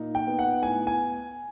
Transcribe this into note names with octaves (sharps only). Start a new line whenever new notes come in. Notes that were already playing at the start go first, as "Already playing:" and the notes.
Already playing: A#2 D#4
G5
B3
F#5
A2 G#5
G#5